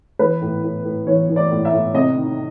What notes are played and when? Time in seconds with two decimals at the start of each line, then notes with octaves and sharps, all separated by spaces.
0.19 E3 B4
0.41 A2
0.63 A2
0.84 A2
1.07 E3 C#5
1.29 E3
1.36 D5
1.51 A2
1.65 E5
1.72 A2
1.94 C3 D#5
2.17 D#3